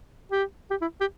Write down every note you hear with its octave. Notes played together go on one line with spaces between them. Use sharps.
G4
G4
E4
G4